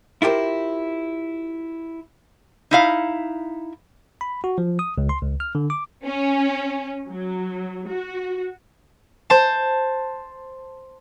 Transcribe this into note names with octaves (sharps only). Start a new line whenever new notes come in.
E4 F4 G4 A#4 C5
D#4 E4 F5
B5
F#4
F3
D#6
C#2
C6
C#2
F6
D3
D6
C#4
F#3
F#4
C5 A5